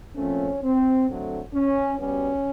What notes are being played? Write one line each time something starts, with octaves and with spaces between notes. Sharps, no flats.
A#2 F3 A3 C4 C#4
C4
D3 F#3 A3 C4
C#4
B2 G3 B3 C#4